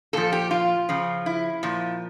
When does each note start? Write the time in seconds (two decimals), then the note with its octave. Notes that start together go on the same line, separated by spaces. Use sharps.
0.13 A#2 F3 A4
0.32 G4
0.51 F4
0.89 C#3 F3
1.26 E4
1.63 A#2 F3